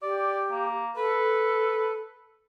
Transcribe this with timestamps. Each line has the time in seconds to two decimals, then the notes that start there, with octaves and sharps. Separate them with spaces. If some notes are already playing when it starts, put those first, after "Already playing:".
0.02 G4 D5
0.51 A#3
0.96 A4 B4